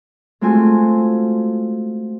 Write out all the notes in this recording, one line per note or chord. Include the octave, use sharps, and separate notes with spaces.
G#3 A3 C4 F4 F#4 G#5